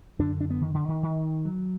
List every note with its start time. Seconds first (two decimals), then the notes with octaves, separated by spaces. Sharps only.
0.19 F#2 D3 D4
0.41 D4
0.50 B3
0.61 D#3
0.74 D3
0.88 D#3
1.03 D#3
1.45 F#3